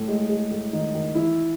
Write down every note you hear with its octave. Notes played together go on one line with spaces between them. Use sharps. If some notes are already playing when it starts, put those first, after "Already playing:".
Already playing: A2 A3
G#3
G#3
A2 A3
D#3 D#4
D#3 D#4
E3 E4